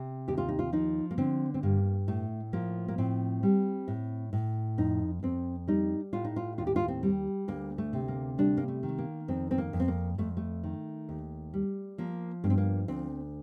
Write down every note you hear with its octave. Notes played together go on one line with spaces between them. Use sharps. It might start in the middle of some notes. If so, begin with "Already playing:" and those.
Already playing: C3
D#2 G4
F4
D#4
F4
F3 D#4
A#3
D3 C4
C4
G2 A#3
A2 A3
F3 A#3
A#3
A2 C4
G3
A2
A2
F2 D#4
F2 C4
G3 D#4
A2 F4
D#4
F4
D#2 F4
G4
F4
C4
G3
D2 A#3
A3
C3
A#3
G3 D4
A#3
A3
D#3
A3
A#3
F2 C4
C4
A#3
F2
C4
A#3
F2 A3
A3
D#3
D#2
G3
F3 A#3
G2 A#3
C4
A#3
D2 C4